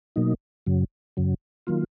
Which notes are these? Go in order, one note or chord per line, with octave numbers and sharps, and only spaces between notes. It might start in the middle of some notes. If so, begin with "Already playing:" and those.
B2 F#3 A#3 D#4
F#2 C#3 F#3
F#2 C#3 F#3
D#3 F#3 A#3 F4